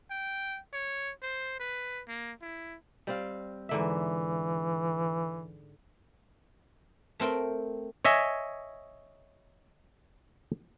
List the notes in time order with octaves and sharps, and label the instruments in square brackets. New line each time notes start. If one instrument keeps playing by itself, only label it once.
[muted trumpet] G5
C#5
C5
B4
A#3
E4
[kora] G3 C4 F5
[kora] G#2 D3 E5 [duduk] E3
[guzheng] A3 C4 A#4 G5
[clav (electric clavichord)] C#5 D#5 E5 G#5